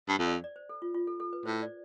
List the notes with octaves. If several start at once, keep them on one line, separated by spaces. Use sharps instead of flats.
G2 C5
F2
D5
D5
C5
A4
F4
F4
A4
A4
B4
A2 C5
D5